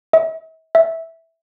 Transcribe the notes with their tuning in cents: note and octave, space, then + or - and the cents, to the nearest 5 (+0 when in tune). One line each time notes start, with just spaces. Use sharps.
E5 -40
E5 -5